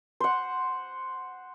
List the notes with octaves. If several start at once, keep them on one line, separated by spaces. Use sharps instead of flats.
C5 F#5